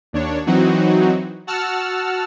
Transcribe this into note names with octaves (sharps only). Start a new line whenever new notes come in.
D#2 D4 C#5
E3 F#3 C4 D#4 F#4
F#4 F#5 A5 E6 F6